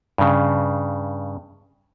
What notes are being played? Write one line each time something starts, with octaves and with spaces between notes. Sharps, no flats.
G2 C#3